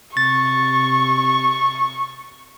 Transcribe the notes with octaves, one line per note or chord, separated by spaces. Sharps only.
C3 C#6 A6